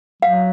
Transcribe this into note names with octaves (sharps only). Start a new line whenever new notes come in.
F#3 F5